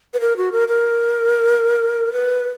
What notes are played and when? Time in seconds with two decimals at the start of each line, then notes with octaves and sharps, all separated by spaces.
0.14 B4
0.20 A#4
0.37 F#4
0.52 A#4
0.68 A#4
2.13 B4